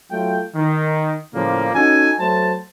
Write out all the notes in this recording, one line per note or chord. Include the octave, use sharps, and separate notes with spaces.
F#3 A3 F4 G5
D#3
A2 C#3 F3 G3 A#3
C#4 D#4 F#4 A4 G#5
F#3 A3 C5 A5